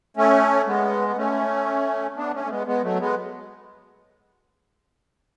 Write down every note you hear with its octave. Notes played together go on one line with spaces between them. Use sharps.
A3 C#4
G#3 B3
B3
A3 C#4
B3 D4
A3 C#4
A3
G#3 B3
G#3 B3
F#3 A3
G#3 B3